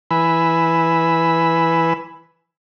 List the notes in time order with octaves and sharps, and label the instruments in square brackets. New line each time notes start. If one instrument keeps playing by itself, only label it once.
[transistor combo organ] E3 B4 G#5 B5 E6